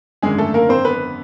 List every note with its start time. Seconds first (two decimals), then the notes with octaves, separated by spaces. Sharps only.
0.22 G#1 F#2 D3 G#3 G#4
0.38 A3 A4
0.54 A#3 A#4
0.69 C4 C5
0.85 B3 B4